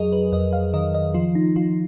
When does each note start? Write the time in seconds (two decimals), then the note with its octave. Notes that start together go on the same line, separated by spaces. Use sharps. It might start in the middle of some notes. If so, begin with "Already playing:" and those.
Already playing: F2 F#3 G#4 A#4 D#5
0.13 B4
0.32 F2 D#5
0.53 F5
0.74 D#3 D#5
0.94 D#5
1.14 F3 F4
1.35 D#4
1.56 F3 F4